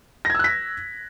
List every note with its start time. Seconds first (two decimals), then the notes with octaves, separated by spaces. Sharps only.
0.25 A#6
0.30 G#6
0.35 E6
0.39 F#6
0.44 B6